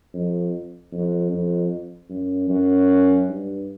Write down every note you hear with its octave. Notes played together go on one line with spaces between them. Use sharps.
F2
F2
F2
F#2
F#2
G2